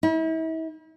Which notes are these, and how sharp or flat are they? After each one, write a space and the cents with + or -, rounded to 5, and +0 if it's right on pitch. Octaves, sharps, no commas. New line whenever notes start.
E4 -40